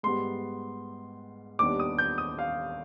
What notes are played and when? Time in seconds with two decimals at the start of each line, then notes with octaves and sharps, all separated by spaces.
0.03 G#2 G3 B3 C6
1.59 D#2 D#3 G3 B3 D4 D6
1.80 D#6
1.98 G6
2.18 D#6
2.39 F5